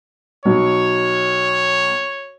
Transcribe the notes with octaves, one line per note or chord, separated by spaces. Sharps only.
B1 C#5